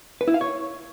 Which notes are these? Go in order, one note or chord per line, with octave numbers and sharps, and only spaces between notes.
B4
E4
F5
C#5